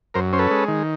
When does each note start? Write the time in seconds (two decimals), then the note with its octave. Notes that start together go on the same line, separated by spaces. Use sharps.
0.14 F#2 A#4 C5
0.33 C#4 C5
0.39 A4 B4
0.51 G#3
0.68 D#3